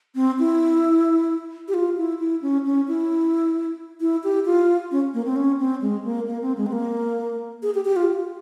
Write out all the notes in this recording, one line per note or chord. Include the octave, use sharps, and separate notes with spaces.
C4
E4
G4
F4
E4
E4
C#4
C#4
E4
E4
G4
F4
C#4
A#3
C4
C#4
C4
G#3
A#3
A#3
C4
G#3
C4
A#3
G#4
G4
G4
F4